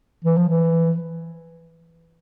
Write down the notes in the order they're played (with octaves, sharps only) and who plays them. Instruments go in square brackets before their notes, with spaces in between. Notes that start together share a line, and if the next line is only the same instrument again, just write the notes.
[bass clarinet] E3
F3
E3